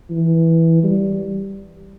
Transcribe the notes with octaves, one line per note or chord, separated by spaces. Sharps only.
E3
G3